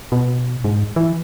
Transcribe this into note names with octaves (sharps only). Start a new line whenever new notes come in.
B2
G#2
E3